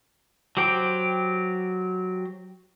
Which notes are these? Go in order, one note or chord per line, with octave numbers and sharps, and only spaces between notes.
F#3 G4 C5 G5